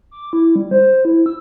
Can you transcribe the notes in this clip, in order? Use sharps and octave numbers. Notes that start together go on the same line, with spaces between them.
D6
E4
G3
C5
E4
E6